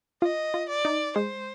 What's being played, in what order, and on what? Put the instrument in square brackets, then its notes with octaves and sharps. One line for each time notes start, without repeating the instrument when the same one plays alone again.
[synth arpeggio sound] F4 [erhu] D#5
[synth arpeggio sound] F4
[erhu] D5
[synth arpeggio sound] D#4
[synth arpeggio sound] G#3 [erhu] C5